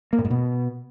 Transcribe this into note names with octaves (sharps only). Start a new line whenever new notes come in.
A#3
A2
G#2
B2